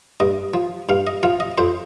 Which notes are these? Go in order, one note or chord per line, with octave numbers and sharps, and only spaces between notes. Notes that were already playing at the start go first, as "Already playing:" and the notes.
G2 D#5
F3
G2 F5
D#5
F3 F5
D#5
F2 C5